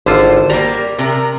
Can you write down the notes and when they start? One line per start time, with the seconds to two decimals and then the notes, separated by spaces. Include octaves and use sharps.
0.06 G#1 D3 F4 C5
0.50 G3 A#3 A#5
0.99 C3 A#4